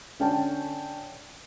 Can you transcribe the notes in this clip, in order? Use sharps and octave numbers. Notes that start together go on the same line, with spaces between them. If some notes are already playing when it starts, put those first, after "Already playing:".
D3 C#4 G5 A5